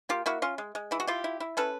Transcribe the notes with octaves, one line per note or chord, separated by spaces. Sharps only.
A#3 F4 G4
A#3 E4 F#4
C#4 F4
G#3
G#3
E3 E4
F#4
E4 F4 G4
E4
E4
C#4 A4 B4